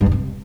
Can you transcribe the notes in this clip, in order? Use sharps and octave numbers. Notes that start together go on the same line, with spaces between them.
G2
E2
C3